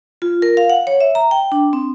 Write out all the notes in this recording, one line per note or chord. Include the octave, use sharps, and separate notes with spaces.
F4
A#4
F5
F#5
C#5
E5
A#5
G5
D4
C4